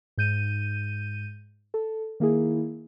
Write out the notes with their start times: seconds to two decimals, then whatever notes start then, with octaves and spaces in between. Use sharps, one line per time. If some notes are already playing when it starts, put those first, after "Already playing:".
0.18 G#2 G6 D#7
1.74 A4
2.20 D#3 A#3 E4 G#4